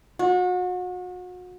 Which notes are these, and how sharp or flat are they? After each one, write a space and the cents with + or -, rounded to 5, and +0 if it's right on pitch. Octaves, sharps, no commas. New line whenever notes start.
F#4 -35